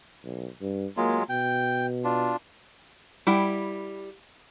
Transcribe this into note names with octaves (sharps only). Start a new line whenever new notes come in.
B1
G2
F#3 G#3 A#3 F4
B2 G5
D4 F4
G3 E4 F#5 G5